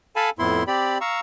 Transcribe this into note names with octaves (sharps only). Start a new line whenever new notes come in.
A4 F5 G#5 A5 B5
F2 A2 B3 E4 C6
C4 G4 D5 B5
F5 A#5 C#6 E6